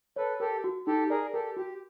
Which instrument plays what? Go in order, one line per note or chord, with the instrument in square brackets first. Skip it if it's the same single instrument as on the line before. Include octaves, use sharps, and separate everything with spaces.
[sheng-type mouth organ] A4 B4 [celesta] C#5
[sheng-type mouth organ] G4 A4 [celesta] A#4
[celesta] F#4
[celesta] D#4 [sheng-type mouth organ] G4 A4
[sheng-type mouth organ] G#4 A#4 [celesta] D5
[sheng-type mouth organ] G4 A4 [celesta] A#4
[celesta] F#4 [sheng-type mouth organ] G4